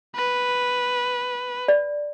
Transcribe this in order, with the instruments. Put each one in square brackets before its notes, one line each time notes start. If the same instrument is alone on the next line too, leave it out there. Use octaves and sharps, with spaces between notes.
[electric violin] B4
[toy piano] D5